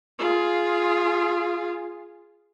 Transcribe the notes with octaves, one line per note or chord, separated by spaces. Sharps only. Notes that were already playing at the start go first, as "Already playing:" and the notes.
F4 G#4